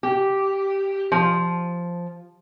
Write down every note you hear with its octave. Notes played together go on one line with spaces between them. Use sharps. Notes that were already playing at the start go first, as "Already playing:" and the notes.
G4
F3